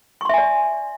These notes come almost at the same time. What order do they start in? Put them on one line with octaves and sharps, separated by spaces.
C#6 C6 E5 G#5 D5